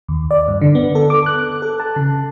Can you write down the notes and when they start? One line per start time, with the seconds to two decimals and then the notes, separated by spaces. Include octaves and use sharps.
0.09 D#2
0.31 D5
0.48 G2
0.61 D3
0.75 B3
0.95 A4
1.10 D6
1.26 F#6
1.62 A4
1.80 A5
1.96 C#3